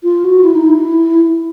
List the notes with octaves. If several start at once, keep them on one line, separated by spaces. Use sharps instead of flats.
F4
F#4
E4
D#4
E4